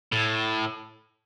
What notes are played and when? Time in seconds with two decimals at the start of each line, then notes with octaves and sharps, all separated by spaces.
0.12 A2